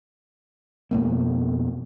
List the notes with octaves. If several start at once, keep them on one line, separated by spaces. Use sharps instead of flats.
F2 B2 A3 A#3